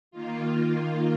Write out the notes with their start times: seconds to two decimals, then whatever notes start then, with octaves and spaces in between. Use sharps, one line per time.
0.11 D#3 A#3 F4